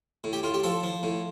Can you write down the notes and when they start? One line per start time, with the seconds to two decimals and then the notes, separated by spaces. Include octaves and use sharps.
0.24 A2
0.33 G4
0.43 A2 F4
0.54 G4
0.63 F3 A4
0.83 F3
1.03 A2